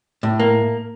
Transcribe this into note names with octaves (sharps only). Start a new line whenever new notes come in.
A2
A#3